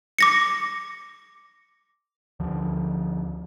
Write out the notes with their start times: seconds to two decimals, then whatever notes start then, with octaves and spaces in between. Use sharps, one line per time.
0.18 D6 A#6 C#7
2.40 D2 D3 F3